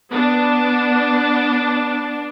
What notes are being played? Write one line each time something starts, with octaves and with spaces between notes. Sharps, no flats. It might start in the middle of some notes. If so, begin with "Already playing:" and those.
B3 D4